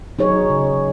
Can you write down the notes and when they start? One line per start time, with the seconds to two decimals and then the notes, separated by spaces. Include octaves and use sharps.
0.19 F#3 D#4 G#4 C#5
0.50 C#3